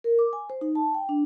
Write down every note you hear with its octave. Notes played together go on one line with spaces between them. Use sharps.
A#4
D6
G#5
C5
D#4
A5
G5
D4